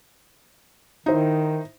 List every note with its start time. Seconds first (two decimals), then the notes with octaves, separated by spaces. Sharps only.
1.06 D#3 D#4 E4 C5